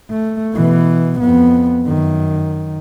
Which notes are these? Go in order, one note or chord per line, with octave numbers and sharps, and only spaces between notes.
A3
B2 E3
F2 B3
F#2 D#3